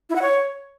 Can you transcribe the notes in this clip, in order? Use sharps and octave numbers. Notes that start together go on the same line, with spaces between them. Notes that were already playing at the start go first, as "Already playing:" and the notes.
E4
F#5
C#5